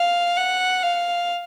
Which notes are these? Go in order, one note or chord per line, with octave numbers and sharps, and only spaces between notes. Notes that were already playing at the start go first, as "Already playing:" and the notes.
Already playing: F5
F#5
F5